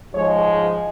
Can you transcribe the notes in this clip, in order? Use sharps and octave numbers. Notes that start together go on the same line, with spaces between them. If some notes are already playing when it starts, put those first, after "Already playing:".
G#2 F3 G#3 C#5